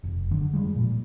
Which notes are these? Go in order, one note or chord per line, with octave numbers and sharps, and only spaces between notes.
F1
F#1 D3
F3 G3 G#3
A#2